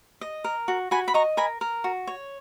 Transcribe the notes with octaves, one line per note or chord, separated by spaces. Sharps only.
D#5
A#4
F#4
F#4 G#5 B5
B5
D#5 A#5 C#6
A#4 G#5 B5
A#4
F#4
C#5